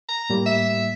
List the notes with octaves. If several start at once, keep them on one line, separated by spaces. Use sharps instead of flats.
A#5
A2 G3 A#3
E5